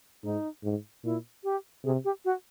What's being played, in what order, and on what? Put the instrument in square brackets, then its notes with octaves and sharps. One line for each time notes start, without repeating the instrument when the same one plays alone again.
[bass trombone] G#2 [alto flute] D#4
[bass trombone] G#2
[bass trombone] A#2 [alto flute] E4
[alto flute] G4
[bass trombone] C3 [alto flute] G#4
[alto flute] G4
F#4